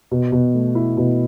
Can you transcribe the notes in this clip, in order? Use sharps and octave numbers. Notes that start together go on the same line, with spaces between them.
B2
B2
A3
E4
B2